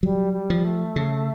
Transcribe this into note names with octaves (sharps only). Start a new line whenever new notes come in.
F#3 G3
G3
F3
A3
C#3